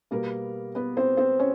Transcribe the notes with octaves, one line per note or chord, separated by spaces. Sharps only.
B2 G3 A#3 B3 A#4
B3 B4
C4 C5
C4 C5
C#4 C#5